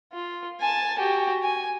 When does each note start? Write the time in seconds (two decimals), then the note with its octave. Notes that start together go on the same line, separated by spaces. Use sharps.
0.12 F4
0.60 G#5 A5
0.98 F#4 G4
1.43 G#5